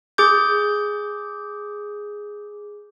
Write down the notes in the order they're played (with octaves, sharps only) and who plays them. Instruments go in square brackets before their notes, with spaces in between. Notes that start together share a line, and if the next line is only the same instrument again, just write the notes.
[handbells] G#4 D6 G6